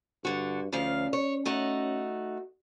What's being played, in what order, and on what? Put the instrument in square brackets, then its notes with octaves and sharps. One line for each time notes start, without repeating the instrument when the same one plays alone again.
[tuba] G2 [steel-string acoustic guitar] D3 F#4
[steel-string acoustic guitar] D2 F3 F5 [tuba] C#4
[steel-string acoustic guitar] C#5
A3 D#4 F#4